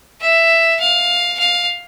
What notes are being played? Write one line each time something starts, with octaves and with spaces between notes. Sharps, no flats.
E5
F5
F5